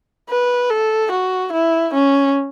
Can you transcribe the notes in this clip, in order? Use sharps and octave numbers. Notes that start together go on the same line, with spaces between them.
B4
A4
F#4
E4
C#4